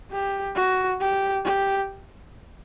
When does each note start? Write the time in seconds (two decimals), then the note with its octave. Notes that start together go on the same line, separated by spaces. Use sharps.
0.12 G4
0.55 F#4
1.01 G4
1.44 G4